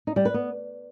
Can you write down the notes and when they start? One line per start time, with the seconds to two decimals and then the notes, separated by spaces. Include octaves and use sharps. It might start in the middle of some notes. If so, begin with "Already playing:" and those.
0.07 D#4
0.16 G3
0.25 B4
0.34 B3